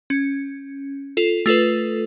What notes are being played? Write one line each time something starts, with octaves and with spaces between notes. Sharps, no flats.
C#4
F4 A4
A3 F4 A4 B4